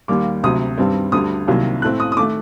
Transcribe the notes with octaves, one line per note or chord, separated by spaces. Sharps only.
D#2 D#3 G3 A#3 D6
D2 C3 F#3 D#6
G2 D#3 G3 C4
D2 D3 G3 D#6
C2 C3 D#3 F#3 A#3
A2 A3 C4 F#6
D#6
D#6
D#3 A3 D6